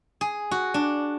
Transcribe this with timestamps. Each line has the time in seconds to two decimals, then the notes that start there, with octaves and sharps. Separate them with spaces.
0.21 G#4
0.51 F#4
0.74 D4